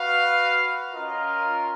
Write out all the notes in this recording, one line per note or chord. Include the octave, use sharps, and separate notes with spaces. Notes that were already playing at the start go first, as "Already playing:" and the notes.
Already playing: F#4 B4 F5
C#4 F4 A#4 D#5